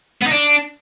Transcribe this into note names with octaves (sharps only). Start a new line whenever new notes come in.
B3
D#4
D4